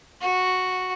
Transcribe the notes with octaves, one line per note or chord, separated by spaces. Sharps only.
F#4